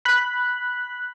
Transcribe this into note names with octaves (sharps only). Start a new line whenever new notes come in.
B5 F#6